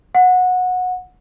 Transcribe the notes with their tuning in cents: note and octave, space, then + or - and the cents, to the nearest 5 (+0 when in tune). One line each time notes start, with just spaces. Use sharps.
F#5 -20